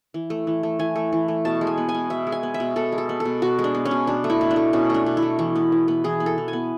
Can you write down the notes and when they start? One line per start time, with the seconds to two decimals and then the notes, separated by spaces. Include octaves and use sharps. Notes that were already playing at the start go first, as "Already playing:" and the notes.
0.14 E3
0.30 A3
0.47 E3
0.63 A3
0.79 E3 G#5
0.96 A3
1.12 E3
1.28 A3
1.45 B2 A5
1.61 G#3
1.67 G#5
1.78 B3
1.89 G#5
1.94 B2
2.10 B2 E5
2.27 G#3
2.32 G#5
2.43 B3
2.54 E5
2.60 B2
2.76 B2 A4
2.92 G#3
2.98 A4
3.09 B3
3.20 A4
3.25 B2
3.42 B2 F#4
3.59 G#3
3.64 D4
3.75 B3
3.85 C#4
3.91 B2
4.07 B2 D4
4.24 A3
4.30 E4
4.41 B2
4.51 D4
4.56 A3
4.73 B2 C#4
4.90 A3 D4
5.06 B2
5.17 E4
5.22 A3
5.39 E3
5.56 B3
5.72 E3
5.88 B3
6.04 E3 G#4
6.20 B3
6.26 A4
6.38 E3
6.48 G#5
6.53 B3